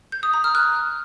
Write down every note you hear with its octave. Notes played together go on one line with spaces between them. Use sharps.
G6
D#6
A#5
F6
F#6